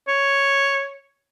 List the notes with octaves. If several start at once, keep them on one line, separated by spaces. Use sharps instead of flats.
C#5